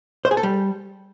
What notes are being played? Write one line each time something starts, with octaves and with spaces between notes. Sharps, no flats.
C5
G#4
A4
G3